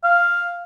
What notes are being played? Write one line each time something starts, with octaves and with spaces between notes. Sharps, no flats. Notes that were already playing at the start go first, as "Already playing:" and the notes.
F5